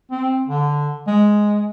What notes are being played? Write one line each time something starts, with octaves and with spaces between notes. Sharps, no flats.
C4
D3
G#3